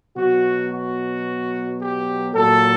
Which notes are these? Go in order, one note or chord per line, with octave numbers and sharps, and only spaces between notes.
B2 F#3 F#4
F#4
G4
A#2 F#3 A4